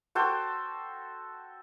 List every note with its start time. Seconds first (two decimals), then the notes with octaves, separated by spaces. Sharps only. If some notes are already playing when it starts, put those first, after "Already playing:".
0.15 F#4 A4 C5 G5